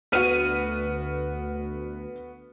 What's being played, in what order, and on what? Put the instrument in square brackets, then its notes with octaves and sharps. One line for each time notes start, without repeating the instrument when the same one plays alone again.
[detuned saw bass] D2 [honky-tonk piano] B3 F#4 [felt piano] B4 F6 D#7